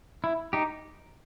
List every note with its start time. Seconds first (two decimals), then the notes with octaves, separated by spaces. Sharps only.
0.24 E4
0.53 D#4 G4